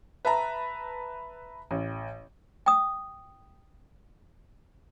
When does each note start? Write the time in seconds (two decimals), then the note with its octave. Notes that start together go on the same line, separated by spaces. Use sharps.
0.25 B4 E5 A5 A#5
1.71 A1
2.66 G5 D#6